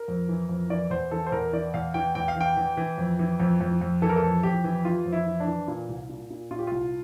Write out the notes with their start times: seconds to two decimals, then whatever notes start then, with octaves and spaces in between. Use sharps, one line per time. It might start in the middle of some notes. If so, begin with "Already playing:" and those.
Already playing: A#4
0.08 F2
0.29 E3
0.49 F2
0.70 E3 D5
0.90 E2 C5
1.11 E3 A4
1.26 C5
1.32 E2 A#4
1.53 E3 D5
1.74 E2 F5
1.94 E3 G5
2.15 E2 G5
2.28 F5
2.36 E3 G5
2.57 E3
2.77 E3
2.98 F2
3.19 E3
3.40 F2
3.61 F2
3.81 F2
4.02 E3 A4
4.09 A#4
4.16 A4
4.23 F2
4.43 F2 G4
4.64 E3
4.85 E3 F4
5.06 F2
5.12 E4
5.26 E3
5.40 D4
5.47 E3
5.68 A#2
5.89 C2
6.09 A#2
6.30 A#2
6.51 A#2 F4
6.59 G4
6.67 C2 F4